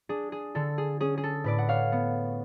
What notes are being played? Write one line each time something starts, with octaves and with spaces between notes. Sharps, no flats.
D4 G#4
G#4
D3 A4
G#4
C#4 G#4
G#4
A4
A2 B4 D5
F#5
C#5 F5
B3